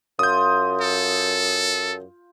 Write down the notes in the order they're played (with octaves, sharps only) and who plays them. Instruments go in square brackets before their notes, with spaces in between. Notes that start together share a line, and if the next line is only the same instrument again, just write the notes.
[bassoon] F#2 [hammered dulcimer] F4 [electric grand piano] D#6 G6
[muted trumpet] A4